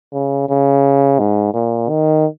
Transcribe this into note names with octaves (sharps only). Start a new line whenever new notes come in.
C#3
C#3
G#2
A#2
D#3